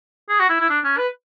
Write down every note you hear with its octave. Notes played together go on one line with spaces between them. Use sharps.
G#4
F#4
E4
E4
D4
C#4
B4